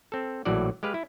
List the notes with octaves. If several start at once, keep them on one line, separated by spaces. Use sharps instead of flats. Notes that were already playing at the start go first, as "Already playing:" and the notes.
C4 A4
A#1 A2 E3 F#3 F#4 D5
G#3 G4 B4 F5
E4